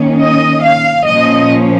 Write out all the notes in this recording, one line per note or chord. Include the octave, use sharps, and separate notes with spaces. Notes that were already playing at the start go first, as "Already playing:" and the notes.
Already playing: D#3 A#3 C#4
D#5
F5
A#2 F3 A#3 C#4 D#5